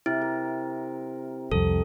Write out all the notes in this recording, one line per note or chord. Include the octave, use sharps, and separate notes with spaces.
C3 E4
A#4
C2 F2 A4